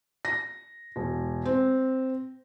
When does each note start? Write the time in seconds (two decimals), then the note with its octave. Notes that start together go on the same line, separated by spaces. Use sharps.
0.25 A#6
0.96 E1
1.45 C4